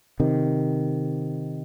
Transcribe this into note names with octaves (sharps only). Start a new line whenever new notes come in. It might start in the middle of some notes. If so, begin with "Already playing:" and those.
C3 D#3